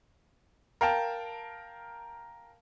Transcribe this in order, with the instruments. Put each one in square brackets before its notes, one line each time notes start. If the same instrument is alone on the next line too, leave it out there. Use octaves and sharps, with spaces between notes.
[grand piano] A#4 F5 G5 A5